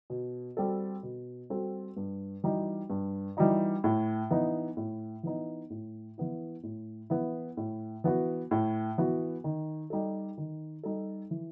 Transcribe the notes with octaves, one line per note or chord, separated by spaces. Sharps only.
B2
G3 C4 F#4 A4
B2
G3 C4 F#4 A4
G2
E3 G3 D#4 F#4
G2
E3 G3 D#4 F#4
A2
E3 B3 D#4
A2
E3 B3 D#4
A2
E3 B3 E4
A2
E3 B3 E4
A2
E3 B3 F#4
A2
E3 B3 F#4
D#3
G3 D#4 A4
D#3
G3 D#4 A4
E3